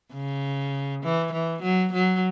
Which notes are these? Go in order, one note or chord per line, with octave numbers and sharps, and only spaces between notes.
C#3
E3
E3
F#3
F#3